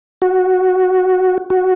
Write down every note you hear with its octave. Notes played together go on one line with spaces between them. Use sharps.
F#4
F#4